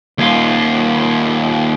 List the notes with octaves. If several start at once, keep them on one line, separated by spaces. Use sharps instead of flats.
D#2 F4